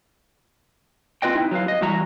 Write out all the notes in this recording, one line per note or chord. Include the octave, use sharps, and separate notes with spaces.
C4 F4 B4 D#5 G5
C4 D#4 E4
F#3 B4 F5
D#5
E2 E3 G3 F#4 E5 A#5